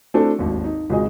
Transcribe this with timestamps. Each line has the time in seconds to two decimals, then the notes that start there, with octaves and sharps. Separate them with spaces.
0.14 A3 C4 D4 E4 F#4 A4
0.39 G#1 D#2
0.64 D#4
0.90 G#1 C#2 F#4 G#4 D#5